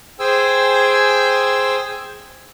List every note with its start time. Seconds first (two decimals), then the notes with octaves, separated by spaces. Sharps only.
0.19 G#4 C5 G5 G#5 E6